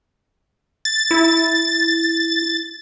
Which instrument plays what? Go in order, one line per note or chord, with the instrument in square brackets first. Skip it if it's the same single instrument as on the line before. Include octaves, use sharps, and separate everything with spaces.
[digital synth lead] A6
[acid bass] E4